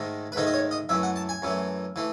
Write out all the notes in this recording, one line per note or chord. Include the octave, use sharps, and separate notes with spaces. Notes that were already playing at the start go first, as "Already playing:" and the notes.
Already playing: G#2 D#3 A3 D#4
B4
G#2 D#3 A3 D#4 A4
D#5
C#5
D#5
F#2 E3 A3 E5
F#5
A5
G#5
F#2 E3 A3
E3 A3